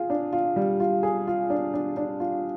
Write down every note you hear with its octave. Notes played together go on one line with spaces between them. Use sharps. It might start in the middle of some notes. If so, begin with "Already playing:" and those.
Already playing: F4 G#4
D4
F4
G3
F4
G#4
F4
D4
D4
D4
F4